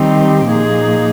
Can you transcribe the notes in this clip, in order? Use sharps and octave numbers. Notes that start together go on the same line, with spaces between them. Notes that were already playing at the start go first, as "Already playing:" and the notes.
Already playing: D#3 G3 C4 D#4 G4
A#2 F3 A#3 D#4 G#4